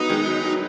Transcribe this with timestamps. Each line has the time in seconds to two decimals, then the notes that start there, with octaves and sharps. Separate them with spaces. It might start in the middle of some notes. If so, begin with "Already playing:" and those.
Already playing: F#3 B3 D#4
0.09 D#3 G#3
0.26 F#3
0.44 F#3